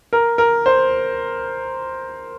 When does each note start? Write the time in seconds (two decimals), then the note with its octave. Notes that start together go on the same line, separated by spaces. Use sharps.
0.13 A#4
0.38 A#4
0.66 C5